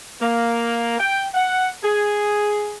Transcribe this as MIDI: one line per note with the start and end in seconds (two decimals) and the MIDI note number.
0.20 0.95 58
0.99 1.24 79
1.34 1.68 78
1.84 2.78 68